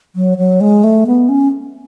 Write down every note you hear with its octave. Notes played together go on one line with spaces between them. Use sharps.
F#3
F#3
G#3
A3
B3
C#4